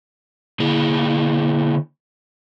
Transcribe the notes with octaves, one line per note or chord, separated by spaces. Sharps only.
D3 A#3 E4 G#4